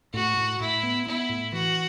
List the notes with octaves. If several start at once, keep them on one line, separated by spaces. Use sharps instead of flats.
A2 F#4
A2
A2 E4
B3
B3 E4
A2
E3 F#4